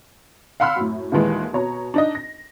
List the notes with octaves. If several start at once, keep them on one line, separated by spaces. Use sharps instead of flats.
F5 F#5 B5 C6 E6 F6
F#2 A2
D#2 A#2 D#3 E3 G#3
B2 C#5 A#5
D4 D#4 D#5
A#6